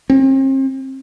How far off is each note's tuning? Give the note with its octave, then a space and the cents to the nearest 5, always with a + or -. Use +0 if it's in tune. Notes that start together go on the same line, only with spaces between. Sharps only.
C4 +40